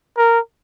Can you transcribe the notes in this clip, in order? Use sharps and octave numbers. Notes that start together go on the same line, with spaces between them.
A#4